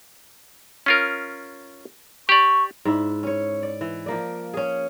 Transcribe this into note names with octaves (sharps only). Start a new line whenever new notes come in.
C#4 F4 A#4
G4 D5 C#6
G#2 D4 E4
C#4 C#5
D5
E3
F3 A#3 D5
C#4 G#4